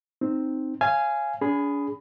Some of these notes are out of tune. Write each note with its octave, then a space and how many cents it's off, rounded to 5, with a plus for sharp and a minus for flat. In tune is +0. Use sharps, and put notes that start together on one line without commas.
C4 +0 D#4 -10
C#5 -15 F5 -20 G#5 +0
D4 -45 G#4 +0 B5 +15